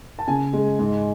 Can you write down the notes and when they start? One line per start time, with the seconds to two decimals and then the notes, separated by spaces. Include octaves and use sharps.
0.19 A5
0.28 C#3 G#5
0.53 G#3
0.79 G#2